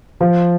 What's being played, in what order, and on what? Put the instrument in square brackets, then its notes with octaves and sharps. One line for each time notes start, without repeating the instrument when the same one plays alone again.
[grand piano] F3